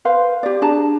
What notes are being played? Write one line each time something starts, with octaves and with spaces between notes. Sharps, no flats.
B4 C5 F5
G4 D5
D4 G#4 A5 A#5